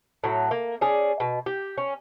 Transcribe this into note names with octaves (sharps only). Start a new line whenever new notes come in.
A2 F#3
A#3
C#4 G#4 D5
B2
G4
C#4